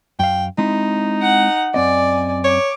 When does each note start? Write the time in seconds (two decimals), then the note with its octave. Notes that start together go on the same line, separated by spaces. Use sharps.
0.19 F#2 F5 G5
0.58 G#3 C4 D#4 E4
1.21 F#5
1.74 F#2 C4 D5 D#5 G#5
2.44 C#5 D6